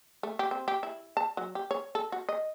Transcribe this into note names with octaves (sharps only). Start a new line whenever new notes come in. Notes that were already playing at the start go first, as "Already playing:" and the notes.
A3
G4
C4
G4
E4
A5
F#3
G4
C#5
A4
F#4
D#5